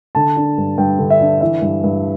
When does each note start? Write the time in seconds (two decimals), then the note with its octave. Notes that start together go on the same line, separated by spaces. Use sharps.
0.15 D3 A5
0.37 D4
0.58 G2
0.78 G2 G5
0.99 D3
1.10 E5
1.21 D4
1.41 E3 E5
1.62 G2
1.83 G2